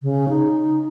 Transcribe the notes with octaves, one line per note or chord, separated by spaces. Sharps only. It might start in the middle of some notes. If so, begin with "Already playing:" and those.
C#3
D#4